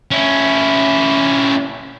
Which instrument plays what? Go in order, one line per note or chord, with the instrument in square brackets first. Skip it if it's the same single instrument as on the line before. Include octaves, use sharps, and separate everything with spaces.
[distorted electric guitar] C#4 E4